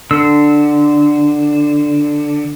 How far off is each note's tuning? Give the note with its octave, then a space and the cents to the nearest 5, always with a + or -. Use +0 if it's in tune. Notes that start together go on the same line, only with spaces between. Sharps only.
D3 +5 E6 -20